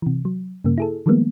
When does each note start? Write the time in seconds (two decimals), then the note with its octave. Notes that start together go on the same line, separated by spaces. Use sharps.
0.02 C3 E3
0.25 F#3
0.64 G2 C#3 A#3
0.78 E4 G#4 A4
1.06 D#3 F3 G3 G#3 A#3 B3